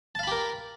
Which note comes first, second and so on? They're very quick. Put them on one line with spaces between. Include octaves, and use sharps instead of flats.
A5 F5 B5 G4 A#4